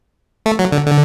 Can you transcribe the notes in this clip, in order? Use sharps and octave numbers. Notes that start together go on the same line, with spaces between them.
A3
F#3
D3
D3